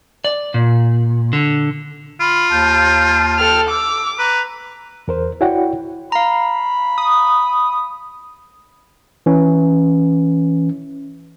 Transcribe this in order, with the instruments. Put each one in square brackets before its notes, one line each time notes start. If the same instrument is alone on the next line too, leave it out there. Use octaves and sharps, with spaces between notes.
[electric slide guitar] D5
A#2
D3
[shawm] F4 [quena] B5
[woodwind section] D#2 A5 [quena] G6
[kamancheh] A4 F6 [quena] G5
[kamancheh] D6 [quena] E6
[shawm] B4 [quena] A#5
[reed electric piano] E2 A#4 C5
E4 F#4 C#5 D5 F#5 G5
[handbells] F5 A#5 [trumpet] B5
[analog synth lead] D#6
[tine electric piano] E3 C#4